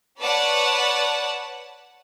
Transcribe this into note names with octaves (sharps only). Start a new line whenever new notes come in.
B4 C#5 D5 F#5 A5